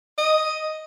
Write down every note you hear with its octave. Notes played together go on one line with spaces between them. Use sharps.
D#5